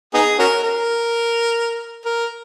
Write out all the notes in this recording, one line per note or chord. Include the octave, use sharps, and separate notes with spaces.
B3 D#4 G#4
C#4 F#4 A#4
A#4
A#4